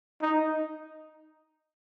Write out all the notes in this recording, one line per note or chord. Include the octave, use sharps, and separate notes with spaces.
D#4